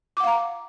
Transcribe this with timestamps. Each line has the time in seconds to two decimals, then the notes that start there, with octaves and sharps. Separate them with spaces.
0.17 D6
0.20 F#5
0.24 F5
0.27 A#5